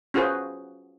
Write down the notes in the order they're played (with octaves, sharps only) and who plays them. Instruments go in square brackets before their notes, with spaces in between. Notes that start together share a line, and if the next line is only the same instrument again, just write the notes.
[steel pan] C#4 F4 F#4 G#4 B4 C5